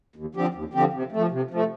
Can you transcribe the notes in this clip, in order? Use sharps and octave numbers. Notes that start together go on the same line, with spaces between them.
D#2
D3 F3 C4 G4
D#2
D3 F3 C4 G4
C3
F3 A3
C3
F3 A3